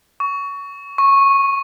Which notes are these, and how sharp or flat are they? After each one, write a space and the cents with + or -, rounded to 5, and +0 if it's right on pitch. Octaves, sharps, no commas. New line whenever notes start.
C#6 +20
C#6 -15